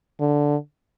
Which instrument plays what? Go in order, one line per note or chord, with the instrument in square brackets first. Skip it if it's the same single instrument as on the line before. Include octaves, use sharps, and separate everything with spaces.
[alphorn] D3